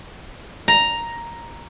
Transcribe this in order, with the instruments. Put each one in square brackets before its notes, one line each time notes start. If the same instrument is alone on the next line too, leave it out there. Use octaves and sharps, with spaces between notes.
[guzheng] A#5